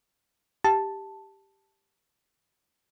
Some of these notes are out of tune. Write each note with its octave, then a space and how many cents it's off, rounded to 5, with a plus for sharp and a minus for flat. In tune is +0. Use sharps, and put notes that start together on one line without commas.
G4 +0 A5 +0